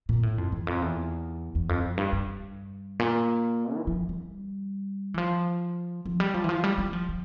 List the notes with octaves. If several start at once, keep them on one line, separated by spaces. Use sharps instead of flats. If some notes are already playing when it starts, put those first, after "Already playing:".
A#2
A2
F2
E2
F2
E2
E2
F2
F2
G2
G2
A#2
E3
F3
G3
E3
F3
F3
G3
F3
E3
F3
G3
G3
F3
F3